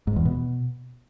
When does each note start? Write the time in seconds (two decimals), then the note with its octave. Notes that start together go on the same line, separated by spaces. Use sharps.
0.07 G#2
0.16 E2
0.25 B2